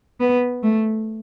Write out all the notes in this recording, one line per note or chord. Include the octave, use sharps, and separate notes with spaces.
B3
A3